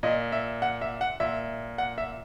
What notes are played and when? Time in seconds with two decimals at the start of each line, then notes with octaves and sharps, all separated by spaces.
0.03 A#2 D#5
0.32 E5
0.62 F#5
0.82 E5
1.01 F#5
1.20 A#2 E5
1.78 F#5
1.98 E5